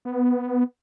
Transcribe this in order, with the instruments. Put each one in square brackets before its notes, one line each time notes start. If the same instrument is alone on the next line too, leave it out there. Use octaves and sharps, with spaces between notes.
[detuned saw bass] B3